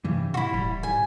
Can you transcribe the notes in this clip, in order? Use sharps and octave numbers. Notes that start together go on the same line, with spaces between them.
G2 C3 E3 G3
A2 E4 F#4 C6
D#1 G3
G#2 G#5